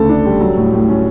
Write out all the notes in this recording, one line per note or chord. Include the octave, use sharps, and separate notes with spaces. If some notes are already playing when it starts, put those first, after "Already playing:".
Already playing: D2 C#3 A4
D4
G3
F#3
A2
A2
C#4